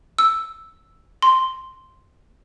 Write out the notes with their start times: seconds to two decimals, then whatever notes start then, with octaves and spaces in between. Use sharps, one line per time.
0.19 E6
1.22 C6